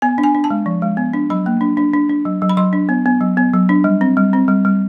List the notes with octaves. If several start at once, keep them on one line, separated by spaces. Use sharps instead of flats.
B3 G#5
D4
G#5
D4
A5
G#3
F3
G#3
B3
D4
F#3 B5
A#3
D4
D4
D4
D4
F#3
F#3
B5
F#3 C6
D4
B3
B3
F#3
B3
F#3
D4
G3
C4
G3
C4
G3
G3